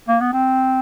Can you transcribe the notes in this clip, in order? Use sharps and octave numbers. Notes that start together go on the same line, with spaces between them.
A#3
B3
C4